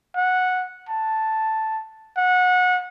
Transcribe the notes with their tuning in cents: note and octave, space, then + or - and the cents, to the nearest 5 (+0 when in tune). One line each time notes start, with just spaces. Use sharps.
F#5 -10
A5 +0
F#5 -25